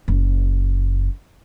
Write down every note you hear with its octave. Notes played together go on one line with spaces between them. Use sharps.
F#1